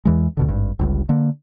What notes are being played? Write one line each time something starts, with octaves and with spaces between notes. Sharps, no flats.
E2 E3 G#3
D2 B2 D3
G#1 G2
G1 C#2 G2
D3 A#3